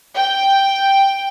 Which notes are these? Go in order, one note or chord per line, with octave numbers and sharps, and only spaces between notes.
G5